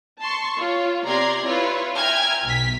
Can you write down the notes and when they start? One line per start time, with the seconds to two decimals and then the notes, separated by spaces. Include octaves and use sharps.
0.21 A5 C6 C#6
0.58 F4 C#5
1.05 C3 D5 A#5 C6 G#6
1.46 E4 F4 B4 C#5
1.96 E5 G5 G#5 A#5 F6 G#6
2.44 B1 B6